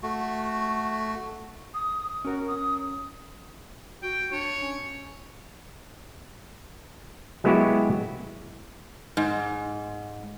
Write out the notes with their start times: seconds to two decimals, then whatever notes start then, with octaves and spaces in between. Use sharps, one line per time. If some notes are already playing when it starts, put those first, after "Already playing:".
0.03 A3 F#4
1.74 D#6
2.25 C#4 F#4 A#4
2.48 D#6
4.03 F#4 G5
4.32 D4 C#5
4.59 C#4
7.44 F#3 G#3 B3 E4 F#4 G4
9.17 G#2